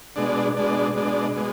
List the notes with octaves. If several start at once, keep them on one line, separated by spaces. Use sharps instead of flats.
B2 G#3 D4
B2 G#3 D4
B2 G#3 D4
B2 G#3